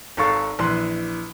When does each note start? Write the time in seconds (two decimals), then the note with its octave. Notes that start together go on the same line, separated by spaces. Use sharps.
0.17 G#1 G#2 A4 F5 C#6 A6
0.59 A#1 E3 C6 F#6